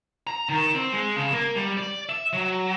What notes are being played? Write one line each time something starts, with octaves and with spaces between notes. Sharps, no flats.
A#5
D#3
C4
G#3
C#3
A#3
G3
D5
E5
F#3